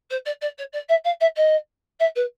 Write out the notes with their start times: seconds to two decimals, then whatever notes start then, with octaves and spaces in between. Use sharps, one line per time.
0.10 C5
0.25 D5
0.41 D5
0.58 C#5
0.73 D5
0.89 E5
1.04 F5
1.21 E5
1.36 D#5
2.00 E5
2.15 B4